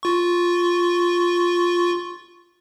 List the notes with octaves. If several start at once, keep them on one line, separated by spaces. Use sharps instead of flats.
F4 C#6